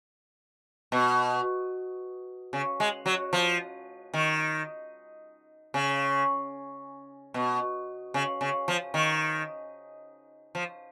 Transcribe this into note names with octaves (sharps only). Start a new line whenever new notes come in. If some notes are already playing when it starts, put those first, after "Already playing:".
B2
C#3
G#3
F#3
F3
D#3
C#3
B2
C#3
C#3
F3
D#3
F3